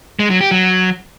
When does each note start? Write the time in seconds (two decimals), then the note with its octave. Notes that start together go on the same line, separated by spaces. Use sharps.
0.19 G#3
0.30 F#3
0.41 G4
0.51 F#3